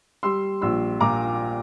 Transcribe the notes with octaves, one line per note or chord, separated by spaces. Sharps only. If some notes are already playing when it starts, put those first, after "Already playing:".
G3 C6 E6
A#1 C6 E6
A#2 A#5 D6